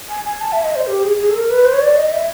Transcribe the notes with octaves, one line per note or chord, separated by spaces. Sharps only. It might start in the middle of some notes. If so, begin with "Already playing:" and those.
G#5
G#5
A5
E5
D#5
C5
G4
G#4
G#4
A4
A#4
B4
C5
C#5
D5
D#5
E5